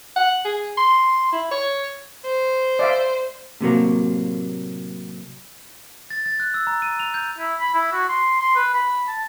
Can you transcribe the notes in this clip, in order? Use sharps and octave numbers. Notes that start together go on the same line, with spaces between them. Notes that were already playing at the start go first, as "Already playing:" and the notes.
F#5
G#4
C6
E4
C#5
C5
D5 E5 F5
A2 C3 F#3 A#3
A6
A6
F#6
E6
A#5
D#7
F7
G6
E4
B5
E4
F#4
C6
C6
B4
B5
A5